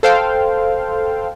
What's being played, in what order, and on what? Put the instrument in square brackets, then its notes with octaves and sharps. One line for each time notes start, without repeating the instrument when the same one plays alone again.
[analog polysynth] A4 C5 F5 G5